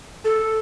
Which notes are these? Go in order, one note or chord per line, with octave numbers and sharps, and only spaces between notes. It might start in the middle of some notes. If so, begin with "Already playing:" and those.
A4